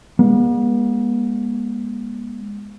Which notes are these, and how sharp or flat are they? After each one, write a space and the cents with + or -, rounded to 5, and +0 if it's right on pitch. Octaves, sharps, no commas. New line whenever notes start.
G#3 -20 B3 -45